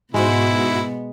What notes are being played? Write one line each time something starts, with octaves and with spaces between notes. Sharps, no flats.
G#2 B2 G#3 B3 E4 F#4 C5 C#7